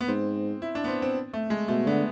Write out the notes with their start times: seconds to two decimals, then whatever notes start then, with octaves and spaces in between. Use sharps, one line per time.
0.01 B3
0.08 G#2 C4
0.62 E4
0.75 D4
0.84 B3
0.88 C4
1.02 C4
1.34 A3
1.50 G#3
1.68 B2 A3
1.86 D3 B3